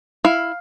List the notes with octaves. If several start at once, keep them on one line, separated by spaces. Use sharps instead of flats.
E4 F5